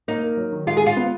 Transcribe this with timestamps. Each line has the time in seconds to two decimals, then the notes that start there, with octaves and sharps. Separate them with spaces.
0.08 A#3 D#4
0.23 A#4
0.37 F#3
0.52 D#3
0.67 G#3 F4
0.77 G#4
0.81 G#3
0.86 F4
0.97 B3